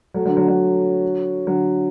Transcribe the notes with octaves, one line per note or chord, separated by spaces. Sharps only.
F#3 A3
D3 F#3
D3 F#3
D3 F#3
D3 F#3